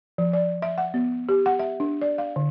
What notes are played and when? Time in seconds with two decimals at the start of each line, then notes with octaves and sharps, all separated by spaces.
0.18 F3
0.33 D5
0.62 E5
0.78 F#5
0.94 B3
1.29 G4
1.46 F#5
1.59 E5
1.80 D4
2.02 D5
2.18 F5
2.36 D3